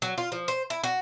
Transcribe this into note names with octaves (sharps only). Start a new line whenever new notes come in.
F#3
F4
F3
C5
E4
F#4